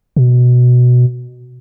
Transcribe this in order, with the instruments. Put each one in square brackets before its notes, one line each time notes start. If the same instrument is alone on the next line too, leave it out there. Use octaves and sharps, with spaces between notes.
[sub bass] B2